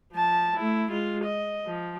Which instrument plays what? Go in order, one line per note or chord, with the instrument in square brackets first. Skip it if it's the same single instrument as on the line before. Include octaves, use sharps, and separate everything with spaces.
[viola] F3 A5
A3 E4
G#3 F4
D#5
F3